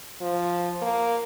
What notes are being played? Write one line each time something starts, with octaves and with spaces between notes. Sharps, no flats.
F3
A#3